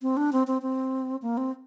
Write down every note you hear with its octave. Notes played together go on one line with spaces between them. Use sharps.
C4
D4
C4
C4
C4
A#3
C4